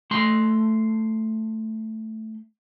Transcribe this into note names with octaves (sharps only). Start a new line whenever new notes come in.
A3 C6